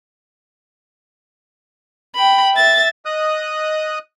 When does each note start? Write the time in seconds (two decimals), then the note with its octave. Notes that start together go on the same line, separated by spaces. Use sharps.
2.15 G5 B5
2.55 E5 A6
3.05 D#5 D#6 F#6